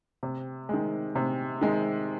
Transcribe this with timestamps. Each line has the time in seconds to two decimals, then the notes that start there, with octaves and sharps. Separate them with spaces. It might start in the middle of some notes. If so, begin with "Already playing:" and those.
0.23 C3
0.69 D#3 G#3
1.15 C3
1.61 D#3 G#3